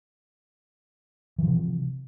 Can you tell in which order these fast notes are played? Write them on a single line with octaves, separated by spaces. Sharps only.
E3 F3 C3